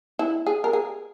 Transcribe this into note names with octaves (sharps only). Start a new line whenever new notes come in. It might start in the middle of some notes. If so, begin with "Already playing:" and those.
E4
G#4
A#4
G#4